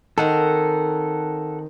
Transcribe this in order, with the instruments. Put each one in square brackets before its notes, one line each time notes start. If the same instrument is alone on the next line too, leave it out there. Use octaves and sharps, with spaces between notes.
[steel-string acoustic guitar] D#3 C4 A#4 [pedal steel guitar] A4 F#5